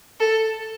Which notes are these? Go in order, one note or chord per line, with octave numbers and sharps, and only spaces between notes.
A4